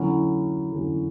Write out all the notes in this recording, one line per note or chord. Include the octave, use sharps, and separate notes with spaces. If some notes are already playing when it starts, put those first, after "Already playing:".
Already playing: D3 F#3 C#4 E4
D3 F#3 C#4 E4